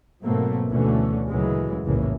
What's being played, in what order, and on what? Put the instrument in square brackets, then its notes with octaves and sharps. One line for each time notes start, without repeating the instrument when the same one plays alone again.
[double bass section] G#2 B2 F#3 A3 A#3 C4
D2 B2 D3 E3 A3 C#4
D2 A#2 C#3 E3 F#3 G#3
F1 B1 A2 C#3 E3 A#3